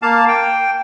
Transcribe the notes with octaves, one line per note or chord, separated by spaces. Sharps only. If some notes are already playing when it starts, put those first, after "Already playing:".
A#3 F5 A5
G5